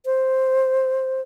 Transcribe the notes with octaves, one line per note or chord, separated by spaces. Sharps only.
C5